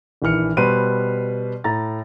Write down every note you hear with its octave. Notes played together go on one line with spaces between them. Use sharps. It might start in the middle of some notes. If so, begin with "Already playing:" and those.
A#1 D#3 E3 F6 C#7
B2 G3 B4 C5 D#7
A2 A#5 A6